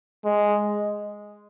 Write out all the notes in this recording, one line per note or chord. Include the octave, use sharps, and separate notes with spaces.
G#3